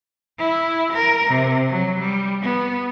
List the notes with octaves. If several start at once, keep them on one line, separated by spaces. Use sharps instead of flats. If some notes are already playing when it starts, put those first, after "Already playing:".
E4
A#4
C3
F#3
G3
B3